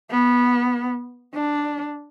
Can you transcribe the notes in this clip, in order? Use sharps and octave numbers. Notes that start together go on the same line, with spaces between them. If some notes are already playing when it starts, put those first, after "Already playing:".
B3
D4